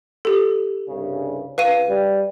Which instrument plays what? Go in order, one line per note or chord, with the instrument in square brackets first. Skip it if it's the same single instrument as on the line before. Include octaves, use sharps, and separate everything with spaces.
[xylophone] G4 A4
[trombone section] C2 G2 C#3
[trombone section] C#2 [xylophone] B4 F5 D#7
[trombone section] G3